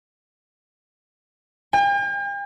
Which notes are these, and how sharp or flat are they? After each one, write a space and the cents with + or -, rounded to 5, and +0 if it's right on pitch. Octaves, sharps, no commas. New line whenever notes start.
G5 +45